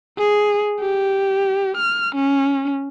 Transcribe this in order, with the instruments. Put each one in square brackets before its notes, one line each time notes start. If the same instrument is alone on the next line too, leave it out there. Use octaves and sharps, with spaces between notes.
[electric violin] G#4
G4
F6
C#4